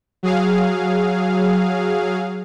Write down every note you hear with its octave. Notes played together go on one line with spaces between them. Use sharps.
F#3 G#4 F5